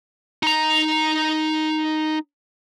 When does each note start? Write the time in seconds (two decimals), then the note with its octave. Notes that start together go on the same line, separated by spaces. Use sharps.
0.43 D#4 A#5